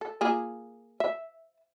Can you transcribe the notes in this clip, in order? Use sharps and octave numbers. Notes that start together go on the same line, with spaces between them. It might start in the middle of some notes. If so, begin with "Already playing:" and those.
A4
A#3 F4 G#4
E5